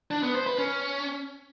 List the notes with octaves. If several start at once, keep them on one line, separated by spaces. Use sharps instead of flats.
D4
B3
C5
B4
C#4